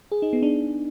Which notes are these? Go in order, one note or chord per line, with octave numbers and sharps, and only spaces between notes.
G#4
D#4
B3
D4